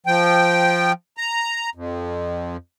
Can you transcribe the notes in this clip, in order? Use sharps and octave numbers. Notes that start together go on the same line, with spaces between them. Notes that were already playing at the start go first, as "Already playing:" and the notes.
F3 G5
A#5
F2